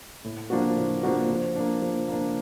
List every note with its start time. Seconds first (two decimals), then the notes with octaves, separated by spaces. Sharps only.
0.24 A2
0.50 F3 A#3 D4 F#4
0.76 A2
1.03 F3 A#3 D4 F#4
1.29 F3
1.56 A#3 D4
1.82 F3
2.08 A#3 D4